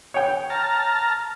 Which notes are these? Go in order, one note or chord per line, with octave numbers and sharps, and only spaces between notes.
C#5 G5
A5 A#5 F6